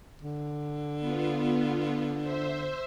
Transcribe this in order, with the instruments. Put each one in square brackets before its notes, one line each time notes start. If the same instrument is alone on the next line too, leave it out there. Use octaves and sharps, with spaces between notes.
[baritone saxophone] D3
[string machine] B3 F4
C5 E5